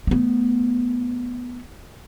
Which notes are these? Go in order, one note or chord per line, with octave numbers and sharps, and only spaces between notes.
A3 B3